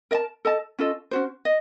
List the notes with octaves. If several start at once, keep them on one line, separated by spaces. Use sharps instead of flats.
A#4 D#5 A5
A4 D#5 A5
C#4 F4 A4 D#5
C#4 F#4 C5
D#5